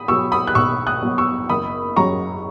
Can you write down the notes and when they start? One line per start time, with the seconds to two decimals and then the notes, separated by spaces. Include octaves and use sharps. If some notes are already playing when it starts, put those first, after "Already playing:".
Already playing: B5 D#6
0.08 B2 F#3 C#6 E6
0.32 B5 D#6
0.47 F#6
0.55 B1 C#6 E6
0.87 D#6 F#6
1.03 B2 F#3
1.18 C#6 E6
1.49 F#1 B5 D#6
1.96 F#2 C#3 F#3 A#5 C#6